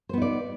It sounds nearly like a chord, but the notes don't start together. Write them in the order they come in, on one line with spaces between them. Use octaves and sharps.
C5 B3 D#4 D5